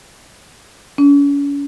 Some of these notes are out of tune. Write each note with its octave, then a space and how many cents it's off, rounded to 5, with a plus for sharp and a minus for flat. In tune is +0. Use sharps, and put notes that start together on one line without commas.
C#4 +40